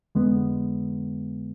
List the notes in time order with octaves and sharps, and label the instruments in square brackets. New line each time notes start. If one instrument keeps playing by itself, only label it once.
[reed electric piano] F2 D3 G#3 B3